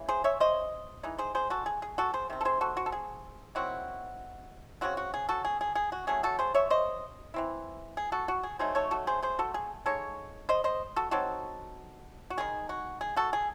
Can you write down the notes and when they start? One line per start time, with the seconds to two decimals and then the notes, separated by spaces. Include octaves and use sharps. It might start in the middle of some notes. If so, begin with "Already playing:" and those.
Already playing: C#3 E3
0.08 G#4 C5
0.24 C#5 E5
0.40 C5 D#5
1.03 E3 G#3 D#4
1.18 G#4 C5
1.35 G#4 C5
1.50 F#4 A4
1.66 G#4
1.82 G#4
1.98 F#4 A4
2.14 G#4 C5
2.30 C3 D#3 C4
2.41 A4
2.45 G#4 C5
2.61 F#4 A4
2.77 F#4
2.86 A4
2.92 G#4
3.55 D#3 F#3 C4 E4 F#4
4.81 C#3 F#3 C4 F#4
4.97 F#4
5.14 G#4
5.29 F#4 A4
5.45 G#4
5.61 G#4
5.75 G#4
5.92 F#4
6.07 F#3 A3 C#4 G#4
6.23 F#4 A4
6.39 G#4 C5
6.54 C#5 E5
6.70 C5 D#5
7.34 E3 C4 E4
7.97 G#4
8.12 F#4 A4
8.28 F#4
8.43 G#4
8.59 F#3 A3 D#4 G#4 C5
8.75 A4 C#5
8.91 F#4 A4
9.07 G#4 C5
9.22 G#4 C5
9.39 F#4 A4
9.54 G#4
9.86 C#3 G#3 D#4 A4 C#5
10.49 C5 D#5
10.64 C5 D#5
10.96 F#4 A4
11.11 F#3 C4 D#4 F#4 A4
12.30 F#4
12.37 D#3 G#3 D#4 G#4
12.69 F#4
13.01 G#4
13.16 F#4 A4
13.33 G#4